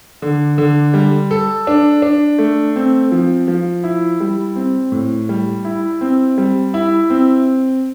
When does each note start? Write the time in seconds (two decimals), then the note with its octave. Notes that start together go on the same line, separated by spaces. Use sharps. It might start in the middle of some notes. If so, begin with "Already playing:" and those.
0.22 D3
0.58 D3
0.94 G3
1.31 A4
1.67 D4
2.02 D4
2.38 A3
2.76 C4
3.12 F3
3.48 F3
3.84 E4
4.20 G3
4.56 C4
4.92 A2
5.29 G3
5.65 E4
6.01 C4
6.38 G3
6.74 E4
7.10 C4